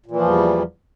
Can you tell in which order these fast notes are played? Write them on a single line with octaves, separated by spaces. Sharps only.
A#2 E3 F3 E2 G3